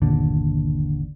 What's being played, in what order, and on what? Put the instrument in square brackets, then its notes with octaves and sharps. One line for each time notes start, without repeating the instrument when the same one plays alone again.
[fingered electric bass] G1 D#2 A#2 [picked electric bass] D3